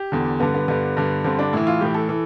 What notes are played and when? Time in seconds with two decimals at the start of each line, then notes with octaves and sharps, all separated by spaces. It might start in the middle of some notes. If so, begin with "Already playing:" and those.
Already playing: G4
0.12 E2 D3
0.40 G2 D3 B3
0.54 B3
0.68 G2 D3 B3
0.97 G2 D3
1.24 G2 D3 C4
1.39 D4
1.53 A2 E3 E4
1.67 F4
1.81 A2 E3 G4
1.94 A4
2.09 E3